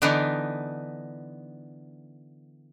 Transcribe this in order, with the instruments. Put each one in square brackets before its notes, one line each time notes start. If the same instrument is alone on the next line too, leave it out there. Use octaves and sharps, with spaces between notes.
[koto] D3 E3 B3 D4 D#4